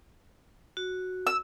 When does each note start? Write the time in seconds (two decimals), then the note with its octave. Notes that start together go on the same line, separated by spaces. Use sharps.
0.77 F#4
1.27 E6